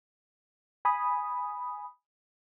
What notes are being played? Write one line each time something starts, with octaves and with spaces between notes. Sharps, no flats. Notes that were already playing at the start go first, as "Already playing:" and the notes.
G#5 B5 D#6